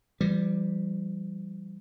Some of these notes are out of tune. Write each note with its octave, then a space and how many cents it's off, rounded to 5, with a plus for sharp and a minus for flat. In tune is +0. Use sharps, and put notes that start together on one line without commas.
E3 +45 G3 +0